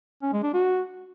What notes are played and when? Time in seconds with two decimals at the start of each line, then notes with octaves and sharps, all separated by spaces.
0.22 C#4
0.33 G#3
0.43 D4
0.54 F#4